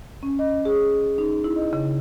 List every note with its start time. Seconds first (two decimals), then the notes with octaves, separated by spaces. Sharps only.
0.23 C#4
0.39 D#5
0.65 G#4
1.18 D#4
1.44 E4
1.56 D#5
1.73 C#3